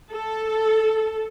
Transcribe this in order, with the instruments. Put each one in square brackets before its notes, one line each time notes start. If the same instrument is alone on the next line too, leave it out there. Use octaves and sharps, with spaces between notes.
[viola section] A4